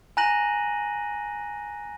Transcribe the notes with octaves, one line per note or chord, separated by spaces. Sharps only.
G#5 A#5 F#6 A#6 D#7 F#7